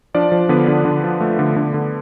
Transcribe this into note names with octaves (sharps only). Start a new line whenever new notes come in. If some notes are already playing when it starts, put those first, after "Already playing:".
F3 D4 D5
F3
D3 B3 B4
D3
D3
F3
A3
D3
D3
D3